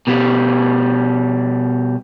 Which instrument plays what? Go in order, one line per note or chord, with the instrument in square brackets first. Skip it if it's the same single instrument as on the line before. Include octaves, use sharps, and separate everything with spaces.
[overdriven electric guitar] B2 G3